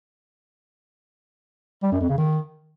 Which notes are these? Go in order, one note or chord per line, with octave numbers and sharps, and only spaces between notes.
G3
F#2
F2
C#3
D#3